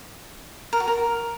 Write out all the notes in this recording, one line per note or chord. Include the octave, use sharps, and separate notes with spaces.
A#4
F#4
A#4